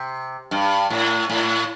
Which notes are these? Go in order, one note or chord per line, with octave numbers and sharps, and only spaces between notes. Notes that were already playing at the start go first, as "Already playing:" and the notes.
Already playing: C3
G2
A2
A2